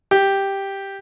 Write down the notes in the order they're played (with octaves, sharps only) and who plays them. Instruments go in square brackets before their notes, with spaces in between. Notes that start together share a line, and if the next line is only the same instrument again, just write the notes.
[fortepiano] G4